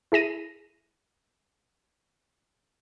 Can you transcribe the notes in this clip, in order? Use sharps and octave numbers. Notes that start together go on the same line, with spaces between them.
E4 G#4 A#6 D#7